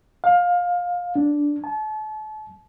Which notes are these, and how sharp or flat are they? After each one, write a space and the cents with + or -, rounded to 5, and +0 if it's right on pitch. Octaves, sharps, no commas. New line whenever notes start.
F5 +20
D4 -5
A5 -35